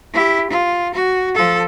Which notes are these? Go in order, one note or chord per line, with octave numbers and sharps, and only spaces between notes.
E4 G4
F4
F#4
F3 A4